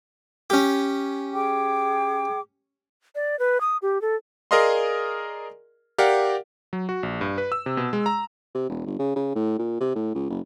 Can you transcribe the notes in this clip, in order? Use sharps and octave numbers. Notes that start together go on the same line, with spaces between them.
C#4 G4
G#4 G5 D6
D5
B4
D#6
G4
A4
G#4 A#4 D5 D#5 F5 C6
G4 A#4 D5 F5 F#5
F#3
F#4
A#1
G2
B4
E6
C3
B2
G#3
A#5
C3
E1
G1
C#3
C#3
A2
A#2
C3
A2
C#2
F#1